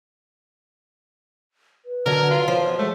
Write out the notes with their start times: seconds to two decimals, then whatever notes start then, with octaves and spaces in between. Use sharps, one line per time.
1.85 B4
2.06 D3 F#3 A#4
2.31 F4
2.48 F3 C#5
2.64 B2
2.79 G#3 A3